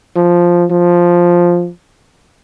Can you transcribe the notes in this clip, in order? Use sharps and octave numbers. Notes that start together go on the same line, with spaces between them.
F3
F3